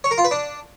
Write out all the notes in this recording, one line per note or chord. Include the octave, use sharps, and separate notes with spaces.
C#5
A#4
F4
B4
D4